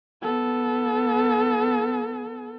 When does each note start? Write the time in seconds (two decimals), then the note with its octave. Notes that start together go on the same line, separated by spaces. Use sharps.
0.22 B3 A4